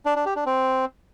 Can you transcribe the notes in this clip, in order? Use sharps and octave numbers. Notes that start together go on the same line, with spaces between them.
D4
D4
G4
D4
C4